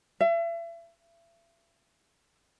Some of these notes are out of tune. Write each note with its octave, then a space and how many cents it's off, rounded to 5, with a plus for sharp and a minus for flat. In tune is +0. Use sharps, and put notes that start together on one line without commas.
E5 +35